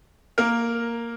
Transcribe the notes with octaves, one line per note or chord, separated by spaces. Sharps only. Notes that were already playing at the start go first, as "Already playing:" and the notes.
A#3 A#4